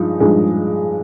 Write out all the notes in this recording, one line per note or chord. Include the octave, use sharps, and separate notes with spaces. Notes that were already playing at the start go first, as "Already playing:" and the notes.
Already playing: G2 F3 G#3 D#4
G2 F3 G#3 D#4